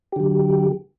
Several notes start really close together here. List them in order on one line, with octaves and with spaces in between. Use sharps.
G4 D3 F#3